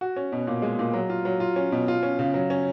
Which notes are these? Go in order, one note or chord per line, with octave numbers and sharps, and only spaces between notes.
F#4
C#4
B2
A#2
G#3
A#2
F#3
F4
F#3
F4
C#4
B2
F4
C#4
C#3
F#3
C#4